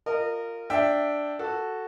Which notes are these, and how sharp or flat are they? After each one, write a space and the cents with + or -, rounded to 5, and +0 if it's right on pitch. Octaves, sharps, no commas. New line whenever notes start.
F4 +0 A#4 -20 D#5 -25
D4 +0 E5 +0 G5 +0
F#4 +0 A4 +0